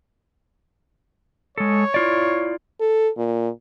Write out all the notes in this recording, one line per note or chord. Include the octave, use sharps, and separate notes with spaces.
G#3 A4 C#5
E4 F4 D5
A4
A#2